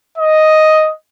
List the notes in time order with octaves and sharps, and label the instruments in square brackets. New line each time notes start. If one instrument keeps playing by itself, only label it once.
[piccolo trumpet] D#5